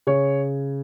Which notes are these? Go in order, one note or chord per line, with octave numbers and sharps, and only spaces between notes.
C#3 C#5